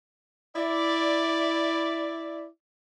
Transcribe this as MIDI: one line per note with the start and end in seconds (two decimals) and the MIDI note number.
0.56 2.47 64
0.56 2.47 74